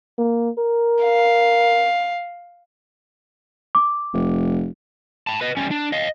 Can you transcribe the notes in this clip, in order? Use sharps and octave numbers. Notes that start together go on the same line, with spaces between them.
A#3
A#4
F5
D6
F1
A5 B5
B4 D#5
G3 C#4
D4
D#5 F5